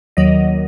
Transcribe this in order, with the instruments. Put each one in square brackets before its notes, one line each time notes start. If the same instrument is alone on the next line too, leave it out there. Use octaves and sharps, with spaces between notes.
[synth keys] D#2 D#3 F#3 D#5